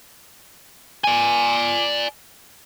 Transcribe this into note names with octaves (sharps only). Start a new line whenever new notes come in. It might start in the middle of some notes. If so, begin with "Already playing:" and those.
D5 G#5